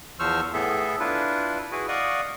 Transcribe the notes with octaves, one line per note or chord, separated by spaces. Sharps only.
E2 F3 C5 C#6 E6 F6
A2 B3 G#4 A4 E5
D4 E4 F4 B4
E4 F#4 G#4 B4
D5 D#5 F5 F#5 C#6 D#6